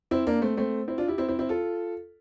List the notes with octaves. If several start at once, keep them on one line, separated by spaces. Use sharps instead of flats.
C4 E4
A#3 D4
A3 C4
A3 C4
C4 E4
D4 F4
E4 G4
C4 E4
C4 E4
C4 E4
F4 A4